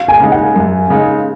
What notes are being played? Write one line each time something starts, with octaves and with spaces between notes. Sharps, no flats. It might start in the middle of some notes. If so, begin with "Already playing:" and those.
Already playing: F5
G#5
C#3 G#3 D#4
F#5
F#2
C#3 G#3 D#4